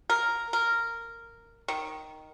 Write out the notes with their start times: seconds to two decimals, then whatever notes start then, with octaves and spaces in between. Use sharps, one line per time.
0.10 A#4
0.53 A#4
1.68 D#3